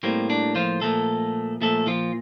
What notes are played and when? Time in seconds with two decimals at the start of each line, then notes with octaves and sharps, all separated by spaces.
0.03 A2 G3 A#3 C4
0.30 D4
0.55 F3 F4
0.82 A#2 F3 A3 A#3 A4
1.61 A#2 F3 A3 A#3 A4
1.87 F3 F4